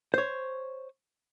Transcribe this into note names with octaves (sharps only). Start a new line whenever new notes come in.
C5 C#5